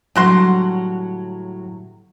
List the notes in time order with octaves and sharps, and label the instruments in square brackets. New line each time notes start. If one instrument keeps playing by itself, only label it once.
[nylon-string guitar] A2 F#3 G3 [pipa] D3 F#4 C6